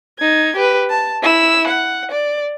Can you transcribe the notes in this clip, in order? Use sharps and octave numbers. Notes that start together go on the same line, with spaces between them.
D#4 G#6
G4 B4
A5
E4 E6
F#5
D5